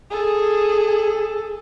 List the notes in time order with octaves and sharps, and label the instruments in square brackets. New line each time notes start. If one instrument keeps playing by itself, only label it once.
[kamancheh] G#4 A4